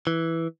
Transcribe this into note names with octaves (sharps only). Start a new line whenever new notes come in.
E3